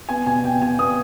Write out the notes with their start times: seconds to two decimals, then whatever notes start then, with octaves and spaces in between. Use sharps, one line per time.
0.09 B3 G#5
0.26 B2 G#5
0.44 B2 G5
0.61 B2 G#5
0.79 B3 D#6